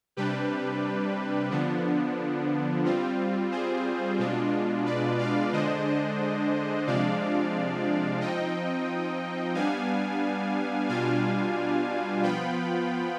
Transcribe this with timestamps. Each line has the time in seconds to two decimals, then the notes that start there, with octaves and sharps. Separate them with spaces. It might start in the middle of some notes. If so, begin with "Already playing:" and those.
0.17 C3 G3 D4 G4 B4
1.51 D3 F3 B3 D4
2.84 G3 C4 F4
3.51 G#4 C5
4.18 B2 G#3 D4 F4
4.85 B4 D5
5.19 D5 F5
5.52 D3 G#3 D4 C5 D#5
6.87 C3 F3 G#3 D4 D5 F5
8.21 F3 C4 D#4 D#5 G5
9.54 G3 B3 D4 F5 G#5
10.89 B2 G3 D4 F4 F5 G#5
12.22 F3 B3 F4 G5 B5